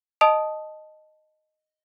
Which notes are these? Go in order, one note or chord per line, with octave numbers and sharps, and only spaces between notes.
D#5 A5 D#6 D7 F7